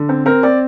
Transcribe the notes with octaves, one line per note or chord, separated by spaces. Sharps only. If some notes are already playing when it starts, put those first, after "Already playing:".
Already playing: D3
C4
C4 A#4
C4 D5